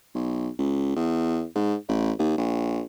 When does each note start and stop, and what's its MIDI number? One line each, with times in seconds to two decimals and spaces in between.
0.15 0.49 35
0.59 0.91 37
0.96 1.45 40
1.55 1.75 44
1.88 2.11 33
2.19 2.34 39
2.38 2.82 34